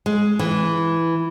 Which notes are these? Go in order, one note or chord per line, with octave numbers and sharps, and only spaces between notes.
G#3
E3